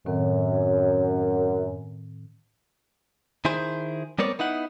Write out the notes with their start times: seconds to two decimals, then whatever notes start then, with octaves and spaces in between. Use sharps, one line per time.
0.06 F#2 A2 D#3 C4
3.45 D#3 E4 G#4 C5
4.19 G3 B3 C4 A#4 C#5 D5
4.39 B3 D#4 E4 F#5